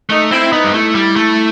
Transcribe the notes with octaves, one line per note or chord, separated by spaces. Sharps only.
A3 D#4
C4 E4
B3 D#4
G3
A3 E4
G3
A3